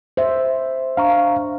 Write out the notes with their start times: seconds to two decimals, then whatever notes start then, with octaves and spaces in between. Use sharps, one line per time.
0.17 C5 E5
0.97 D4 F5 A#5 C#6